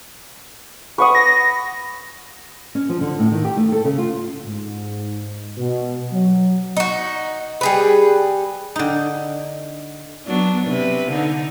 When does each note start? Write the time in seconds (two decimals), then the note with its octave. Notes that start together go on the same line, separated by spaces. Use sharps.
0.98 B4 F#5 C#6 D#6
1.15 A#6
2.75 C#4
2.89 F3
3.01 D3
3.19 A2
3.32 D#3
3.45 G4
3.57 A3
3.72 A4
3.85 C#3
3.98 F4
4.46 G#2
5.57 B2
6.12 F#3
6.77 D#4 F#4
7.61 G3 G#4 B4
8.76 D3 D#4
10.27 F#3 B3 D4
10.67 C3 B4
11.12 D3 D#4